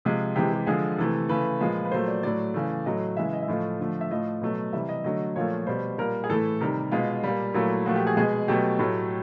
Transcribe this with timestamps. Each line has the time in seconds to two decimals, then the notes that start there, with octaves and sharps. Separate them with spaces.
0.05 C3 F3 G#3
0.35 C3 E3 G#3 G4
0.52 G4
0.67 D3 F3 G#3 G#4
0.98 C3 E3 A3 A4
1.29 C#3 E3 A3 B4
1.60 A#2 F3 G#3
1.85 B4
1.91 A#2 F#3 A3 C5
2.08 D5
2.23 A2 F#3 A3 D5
2.54 C#3 E3 A3
2.86 A2 F#3 A3 D#5
3.17 C#3 E3 G#3 E5
3.33 D#5
3.42 E5
3.48 A2 F3 A3 D#5
3.80 D3 F3 A3
4.01 E5
4.11 A2 F3 A3 D#5
4.41 B2 F#3 A3
4.73 C3 E3 G3 E5
4.89 D#5
5.04 D3 F#3 A3 D#5
5.36 A#2 F3 A3 C#5
5.67 B2 G3 C5
5.98 A#2 G3 A#4
6.24 G#4
6.30 A2 E3 A3 A4
6.61 C3 D#3 G3 A#4
6.91 B2 G#3 F4
7.23 A#2 G3
7.54 A#2 F#3 A3 E4
7.86 A#2 F3 A3 F#4
7.96 G4
8.07 G#4
8.17 B2 G#3 G#4
8.48 B2 F#3 A3 G4
8.79 A2 F#3 A3